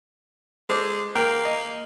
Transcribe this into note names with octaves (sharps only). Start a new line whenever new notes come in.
G#3 A4 C5 D6
A#3 A#4 G5
D#5